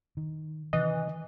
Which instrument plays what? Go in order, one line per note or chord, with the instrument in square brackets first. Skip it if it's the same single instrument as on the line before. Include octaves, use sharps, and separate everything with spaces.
[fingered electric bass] D#3
[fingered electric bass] C3 D#3 [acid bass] E3 [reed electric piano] D#5